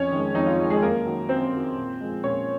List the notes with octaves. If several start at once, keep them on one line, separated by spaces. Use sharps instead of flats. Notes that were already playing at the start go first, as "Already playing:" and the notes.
Already playing: F2 C#4 C#5
D#3 G#3
F2 D#4
F4
G#3
D#3
G#3 G#4
F#2 A#3 A#4
D#3 F#3
F#2 C4 C5
D#3 F#3
A#2
F3 G#3
A#2 C#4 C#5